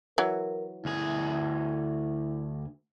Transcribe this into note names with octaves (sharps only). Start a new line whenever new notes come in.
E3 F#3 A#4
D2 E4 G#4